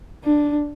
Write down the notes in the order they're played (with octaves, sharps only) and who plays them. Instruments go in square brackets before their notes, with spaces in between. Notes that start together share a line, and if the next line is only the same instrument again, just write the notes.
[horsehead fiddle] D4